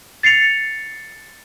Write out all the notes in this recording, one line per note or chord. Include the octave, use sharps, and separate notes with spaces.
A6 C7 C#7 F7